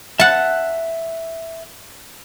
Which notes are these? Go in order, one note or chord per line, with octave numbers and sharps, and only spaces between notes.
E5 F#5 A5 F#6